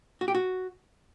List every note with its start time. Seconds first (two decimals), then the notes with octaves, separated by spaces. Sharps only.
0.21 F#4
0.28 G4
0.35 F#4